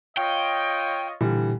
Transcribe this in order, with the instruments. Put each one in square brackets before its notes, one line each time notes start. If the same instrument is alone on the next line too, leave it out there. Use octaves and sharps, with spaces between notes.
[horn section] F4 C#5 D#5 [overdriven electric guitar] G5
[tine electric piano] A#2 [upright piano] D3 E3 G3